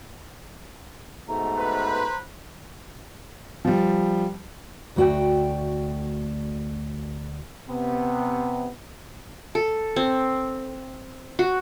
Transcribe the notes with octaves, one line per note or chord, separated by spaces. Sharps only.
G#2 B2 A3 A#5
B4 C5
F3 G3
D2 A3 F#4 D5 G5
C3 B3
A4
C4
F#4